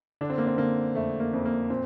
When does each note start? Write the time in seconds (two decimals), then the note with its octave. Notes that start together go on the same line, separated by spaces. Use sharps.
0.21 D3 D4
0.30 C4
0.38 A#3
0.47 C4
0.58 D3 A#3
0.95 F2 A3
1.20 A#3
1.33 F2
1.45 A#3
1.70 A#2 C4